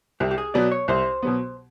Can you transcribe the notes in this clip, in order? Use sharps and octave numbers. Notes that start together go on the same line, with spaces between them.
C2 G4
G4
G#4
B2 F#3 B3 D5
C#5
C2 C5
B2 F#3 B3